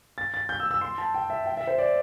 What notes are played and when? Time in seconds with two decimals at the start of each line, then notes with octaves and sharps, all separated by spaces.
0.18 A6
0.34 A6
0.49 G6
0.60 E6
0.71 E6
0.81 C6
0.98 A5
1.14 G5
1.30 E5
1.46 G5
1.57 E5
1.67 C5
1.78 D5